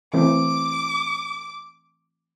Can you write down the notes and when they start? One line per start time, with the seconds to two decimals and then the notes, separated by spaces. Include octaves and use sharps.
0.14 E3 A3 C4 D6